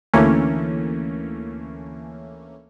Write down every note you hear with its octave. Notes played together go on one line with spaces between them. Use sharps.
D2 E3 A3 A#3 C#4